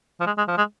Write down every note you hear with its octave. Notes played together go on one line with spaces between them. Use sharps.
F3
G#3
G#3
F3
G#3